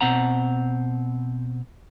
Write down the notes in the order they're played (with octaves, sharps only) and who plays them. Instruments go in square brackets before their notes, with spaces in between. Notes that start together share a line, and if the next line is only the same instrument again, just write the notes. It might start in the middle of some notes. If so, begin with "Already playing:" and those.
[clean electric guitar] B2 C4 F#5 A#5